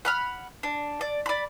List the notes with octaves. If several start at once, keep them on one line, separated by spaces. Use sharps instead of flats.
F#5 B5 F6
D4
D5
D5 B5